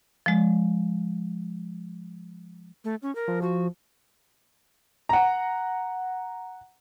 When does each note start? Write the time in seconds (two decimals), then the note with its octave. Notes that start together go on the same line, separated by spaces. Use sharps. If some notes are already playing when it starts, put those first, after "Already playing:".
0.26 F3 G#3
2.84 A3
3.02 C#4
3.15 A#4
3.28 F3
3.42 F3 F#4
5.09 F#5 A#5